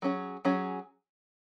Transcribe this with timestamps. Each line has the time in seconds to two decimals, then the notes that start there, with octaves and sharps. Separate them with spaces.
0.02 F#3 C#4 G#4
0.45 F#3 C#4 G#4